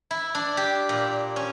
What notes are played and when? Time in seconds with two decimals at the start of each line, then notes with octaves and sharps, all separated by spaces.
0.11 E4
0.35 D4
0.57 G4
0.89 A#2
1.36 C#4